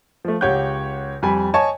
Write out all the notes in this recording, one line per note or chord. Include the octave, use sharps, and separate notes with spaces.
F3 A3
C#2 G4 C#5 F#5 G6
F2 G3 G#5 B5
C#5 D#5 G#5 A5 C#6